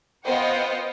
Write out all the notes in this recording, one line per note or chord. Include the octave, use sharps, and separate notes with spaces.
B3 F4 C5 D#5 F#5 G5